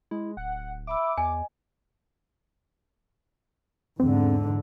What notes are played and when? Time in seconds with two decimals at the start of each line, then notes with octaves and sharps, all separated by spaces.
0.11 G#3 E4
0.37 D1 F#5
0.87 E5 B5 D6 E6
1.18 E2 D#5 G#5
4.00 E2 G#2 D3 C4